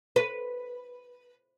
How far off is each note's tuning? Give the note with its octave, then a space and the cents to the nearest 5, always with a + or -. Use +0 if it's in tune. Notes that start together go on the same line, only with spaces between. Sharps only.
B4 -5